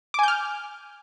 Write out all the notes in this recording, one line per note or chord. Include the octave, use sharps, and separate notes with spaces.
G#5 D6 F6 G6